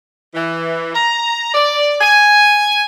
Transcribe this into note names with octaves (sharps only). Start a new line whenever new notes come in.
E3
A#5
D5
G#5